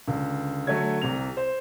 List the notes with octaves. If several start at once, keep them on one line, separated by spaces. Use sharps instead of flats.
C#2 D3
D3 F#3 A3 F#4 C#5 G#6
C2 C3 F7
C5